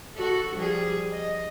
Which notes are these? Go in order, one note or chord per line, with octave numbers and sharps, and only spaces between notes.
F#4 A4
F3 G3 G#4
D#5